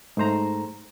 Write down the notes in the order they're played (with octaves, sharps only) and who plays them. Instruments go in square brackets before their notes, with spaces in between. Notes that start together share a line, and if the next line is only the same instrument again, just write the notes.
[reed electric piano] G#2 A3 C5 A#5